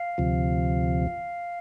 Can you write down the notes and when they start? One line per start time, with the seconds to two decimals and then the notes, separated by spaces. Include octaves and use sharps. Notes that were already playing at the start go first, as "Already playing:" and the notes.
Already playing: F5
0.18 D2 C3 F3